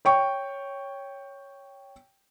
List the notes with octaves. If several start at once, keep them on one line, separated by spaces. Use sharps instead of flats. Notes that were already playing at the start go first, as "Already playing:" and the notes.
C#5 G5 C#6